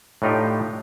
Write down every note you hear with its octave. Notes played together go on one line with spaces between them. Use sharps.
A2 D4 D#4 F4 G4